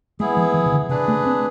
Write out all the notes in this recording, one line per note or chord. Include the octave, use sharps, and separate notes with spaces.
G#3 B3 E4 G#4
F3
E3
C3
D3
C3 D4 G#4 B4
A3
C4